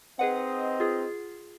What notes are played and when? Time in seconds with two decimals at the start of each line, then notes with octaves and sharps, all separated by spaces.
0.19 C4 D#4 G#4 B4 D#5 F#5
0.80 F4 G#4